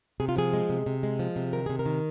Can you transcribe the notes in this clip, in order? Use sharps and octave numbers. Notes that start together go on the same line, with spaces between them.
C3 G#4
F4
F3 G#4
G#3
C3
C3
G#3
F3
C3
D#3 A#4
C3 G#4
A#4
D#3